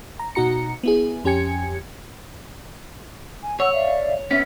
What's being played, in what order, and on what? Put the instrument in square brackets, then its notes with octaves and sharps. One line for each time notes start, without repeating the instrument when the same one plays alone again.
[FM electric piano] A#5
B2 D#4 F#4 A#5 C#7
B3 E4 G#4
F2 C#4 G4 G#5 G#6 C#7
[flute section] G#5
[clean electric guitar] C#5 [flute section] F#5 E6
[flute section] D5 E5 F5
[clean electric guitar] B3 C#4 [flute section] E5